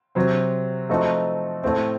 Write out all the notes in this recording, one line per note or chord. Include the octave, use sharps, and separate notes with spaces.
C3 F#3 C4
F3 A3 C4 D#4 F#4
A2 A3 C4